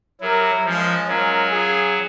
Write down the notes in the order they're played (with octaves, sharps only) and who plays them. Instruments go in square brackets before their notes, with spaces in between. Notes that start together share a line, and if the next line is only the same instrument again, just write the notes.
[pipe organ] F#3 [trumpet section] E4 G4 A#4
[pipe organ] F3 [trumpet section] G#3 C#4 F4
[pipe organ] F#3 [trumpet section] G#3 C#4 F4 A#4
[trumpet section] C#4 F4 G#4